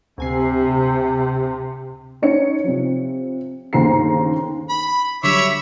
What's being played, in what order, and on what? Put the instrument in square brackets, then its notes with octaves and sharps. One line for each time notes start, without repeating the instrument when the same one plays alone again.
[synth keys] D2 G#5 C7 [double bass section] C3
[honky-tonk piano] C#4 D#4 C#5 C#7
C3 F3
G1 D#2 C#3 C5 A#5 C7
[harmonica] B5
[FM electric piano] D3 F#3 G3 [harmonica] C#5 E5 D6 [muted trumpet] B5